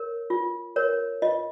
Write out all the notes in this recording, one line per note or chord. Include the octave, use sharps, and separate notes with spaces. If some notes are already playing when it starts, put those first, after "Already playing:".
Already playing: A#4 C#5
F4
A#4 C#5
F4 D#5